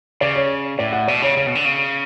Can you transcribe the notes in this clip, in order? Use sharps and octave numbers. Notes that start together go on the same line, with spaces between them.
C#3 D5
C#5
A2 D5
F#5
B2 D5
C#3 C#5
C#3 C#5
B2
D3
C#3